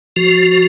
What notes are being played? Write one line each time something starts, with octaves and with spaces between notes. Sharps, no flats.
F3 F#4